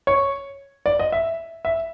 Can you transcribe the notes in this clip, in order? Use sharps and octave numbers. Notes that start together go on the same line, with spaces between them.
C#5
D5
D#5
E5
E5